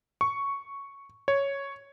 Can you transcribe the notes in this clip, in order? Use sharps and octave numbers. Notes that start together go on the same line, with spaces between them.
C#6
C#5